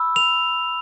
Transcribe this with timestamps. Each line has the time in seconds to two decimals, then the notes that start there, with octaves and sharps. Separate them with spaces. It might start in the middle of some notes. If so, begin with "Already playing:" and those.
Already playing: B5 E6
0.16 F7